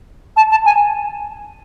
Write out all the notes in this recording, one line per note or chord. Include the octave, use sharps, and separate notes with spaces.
A5
A5
G#5